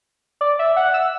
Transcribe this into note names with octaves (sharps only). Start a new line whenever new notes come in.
D5
E5
F#5
E6